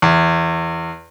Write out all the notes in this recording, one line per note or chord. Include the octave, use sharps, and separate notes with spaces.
E2